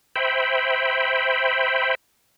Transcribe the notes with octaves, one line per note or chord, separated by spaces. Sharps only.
C5 E5 G5 B5